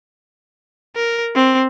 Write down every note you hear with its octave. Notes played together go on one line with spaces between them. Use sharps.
A#4
C4